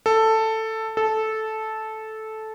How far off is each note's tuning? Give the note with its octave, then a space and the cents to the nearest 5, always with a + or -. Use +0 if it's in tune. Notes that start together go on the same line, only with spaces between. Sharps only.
A4 +10
A4 -10